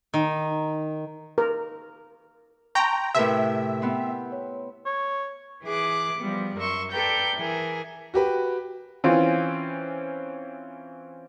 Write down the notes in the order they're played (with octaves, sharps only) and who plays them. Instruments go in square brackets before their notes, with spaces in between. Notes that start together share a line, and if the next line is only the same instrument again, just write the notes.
[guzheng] D#3
[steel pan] A#4
[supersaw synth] G5 A#5 [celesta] A5 C6 C#6
[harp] A2 C3 [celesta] A#4 B4 A5 [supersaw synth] E5
[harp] B3 C4
[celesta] C#5
[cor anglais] C#5
[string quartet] E3 G#4 D6 F#6
F3 G3 B3
F#2 A#4 E5 C6 C#6
A4 B4 D5 G5 A#5 G6
E3 G#4 A#4
[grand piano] F#4 G4 B4
[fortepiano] E3 C4 C#4 F4